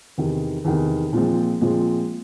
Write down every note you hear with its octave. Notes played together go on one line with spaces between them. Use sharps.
E2 C3 D#3
E2 C3 D#3
A#2 F3 G#3 C4
A#2 F3 G#3 C4